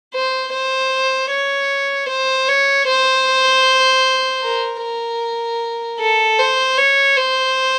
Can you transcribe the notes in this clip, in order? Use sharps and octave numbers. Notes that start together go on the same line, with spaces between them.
C5
C5
C#5
C5
C#5
C5
A#4
A#4
A4
C5
C#5
C5